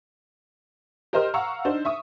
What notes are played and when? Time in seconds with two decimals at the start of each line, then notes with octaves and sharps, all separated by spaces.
1.13 G4 A#4 C5 D#5 C6 F6
1.34 F5 F#5 A#5 C#6 E6
1.65 D4 D#4 C5
1.85 E5 C#6 D#6